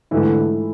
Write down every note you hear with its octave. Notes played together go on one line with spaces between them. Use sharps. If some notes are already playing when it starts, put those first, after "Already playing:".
G#2 D3 E3 A3 E4